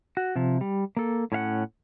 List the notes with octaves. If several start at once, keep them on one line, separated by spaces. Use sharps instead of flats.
F#4
C3 F3
G3
A#3 A4
A2 C#4 F5 F#5